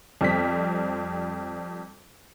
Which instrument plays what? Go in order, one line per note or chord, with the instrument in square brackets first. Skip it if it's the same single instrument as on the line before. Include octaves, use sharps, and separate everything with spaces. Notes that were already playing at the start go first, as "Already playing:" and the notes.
[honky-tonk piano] F2 G3 C4 B6